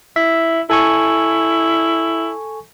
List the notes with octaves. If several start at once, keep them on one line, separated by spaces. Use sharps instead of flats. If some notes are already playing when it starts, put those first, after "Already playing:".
E4 E5
E4 A4 G#5 C#6